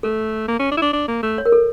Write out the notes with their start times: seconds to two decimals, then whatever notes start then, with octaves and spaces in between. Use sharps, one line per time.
0.03 A3 A4
0.48 A#3
0.59 C#4
0.71 D4
0.77 E4
0.82 D4
0.93 D4
1.08 A#3
1.23 A3
1.38 C#5
1.46 A#4
1.52 A4